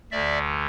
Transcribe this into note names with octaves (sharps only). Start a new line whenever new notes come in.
D2 D3 D5 E5